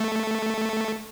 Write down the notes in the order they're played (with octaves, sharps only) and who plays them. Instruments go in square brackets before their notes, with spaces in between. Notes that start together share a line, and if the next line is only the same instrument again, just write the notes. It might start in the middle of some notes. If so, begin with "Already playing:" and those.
Already playing: [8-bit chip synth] A3